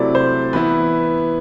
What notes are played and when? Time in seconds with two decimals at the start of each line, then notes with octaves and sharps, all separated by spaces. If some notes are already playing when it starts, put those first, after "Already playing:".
Already playing: C3 F#3 A3 E4 D5
0.15 C5
0.53 E3 B3 E4 B4